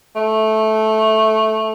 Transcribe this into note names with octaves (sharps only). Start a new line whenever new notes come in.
A3